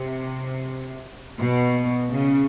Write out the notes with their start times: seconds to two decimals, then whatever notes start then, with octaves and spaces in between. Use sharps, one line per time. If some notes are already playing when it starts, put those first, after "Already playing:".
Already playing: C3
1.40 B2
2.11 C#3